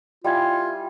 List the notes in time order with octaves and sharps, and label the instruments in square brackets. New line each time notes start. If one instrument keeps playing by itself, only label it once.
[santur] G3 E4 G#5 [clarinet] F4 [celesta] E5 F5 G#6